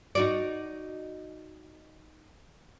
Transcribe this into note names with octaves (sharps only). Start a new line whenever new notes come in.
D#4 F#4 D5